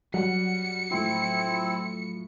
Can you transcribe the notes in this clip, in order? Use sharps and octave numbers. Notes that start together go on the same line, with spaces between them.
F#3 G3 F#5 C#7
A2 F3 C4 E4